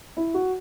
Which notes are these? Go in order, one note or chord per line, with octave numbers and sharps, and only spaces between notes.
E4
F#4